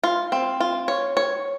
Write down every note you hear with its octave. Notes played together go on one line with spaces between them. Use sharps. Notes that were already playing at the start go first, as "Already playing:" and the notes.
F4
C4
F4
C#5
C#5